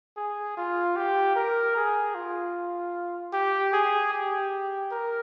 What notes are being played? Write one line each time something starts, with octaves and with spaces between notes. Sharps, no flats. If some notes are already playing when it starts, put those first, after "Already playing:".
G#4
F4
G4
A#4
G#4
F4
G4
G#4
G4
A#4